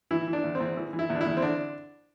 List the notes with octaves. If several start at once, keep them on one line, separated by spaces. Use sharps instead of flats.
E3 E4
E3
D4
E2
C4
E2
E3
E3
E4
E2
D4
E4
E2
C4
D3 D4